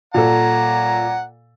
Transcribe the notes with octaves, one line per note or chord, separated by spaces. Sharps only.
A#2 A4 F#5 A#5